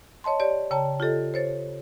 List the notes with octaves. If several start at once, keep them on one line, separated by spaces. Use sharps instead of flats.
C#5 D#5 A5 C6
G4 C#5 D5
C#3 C#5 G5 A5 A#5
F4 G4 A4 D#5
C5 C#5 A6